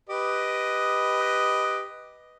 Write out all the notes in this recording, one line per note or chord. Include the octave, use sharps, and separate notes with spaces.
G4 B4 D#5